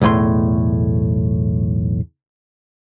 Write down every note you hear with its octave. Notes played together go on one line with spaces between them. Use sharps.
B1 E2 A2 A3 C6